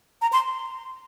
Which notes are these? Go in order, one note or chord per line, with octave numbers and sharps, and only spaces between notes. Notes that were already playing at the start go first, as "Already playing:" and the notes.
A#5
C6